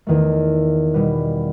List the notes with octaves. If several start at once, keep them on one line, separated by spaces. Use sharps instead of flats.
E2 D#3 A3
B2 G3 B3